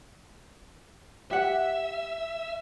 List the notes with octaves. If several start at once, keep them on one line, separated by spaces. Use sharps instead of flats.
G4 E5 F#5